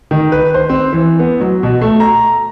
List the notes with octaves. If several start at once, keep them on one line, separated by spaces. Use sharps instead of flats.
D#3
B4
C5
C4
E3
B3
F#3
B2
A3
A#5